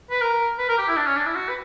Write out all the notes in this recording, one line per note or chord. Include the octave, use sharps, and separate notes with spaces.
B4
A#4
B4
A#4
G4
E4
D4
C#4
D4
E4
F#4
B4